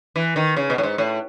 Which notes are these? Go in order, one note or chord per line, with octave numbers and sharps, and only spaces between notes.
E3
D#3
C#3
B2
A2
G#2
A2